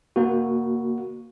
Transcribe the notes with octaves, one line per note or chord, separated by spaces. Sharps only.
A#3 F#4